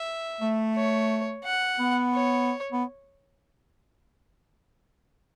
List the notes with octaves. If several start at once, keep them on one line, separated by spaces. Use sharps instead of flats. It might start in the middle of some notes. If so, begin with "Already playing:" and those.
Already playing: E5
A3
C#5
F#5
B3
C#5
B3